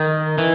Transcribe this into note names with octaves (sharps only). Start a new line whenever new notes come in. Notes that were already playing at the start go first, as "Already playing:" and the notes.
Already playing: D#3
E3